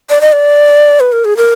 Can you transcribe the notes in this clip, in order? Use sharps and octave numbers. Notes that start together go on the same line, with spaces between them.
D5
D#5
D5
B4
A#4
G#4
A#4